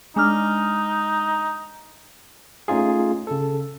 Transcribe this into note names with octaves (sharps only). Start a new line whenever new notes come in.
G#3 D4 D#4 F6
A3 C#4 D#4 F4 G#4
C#3 A4